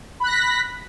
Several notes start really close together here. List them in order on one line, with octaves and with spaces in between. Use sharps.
B5 F#6 A#6 B6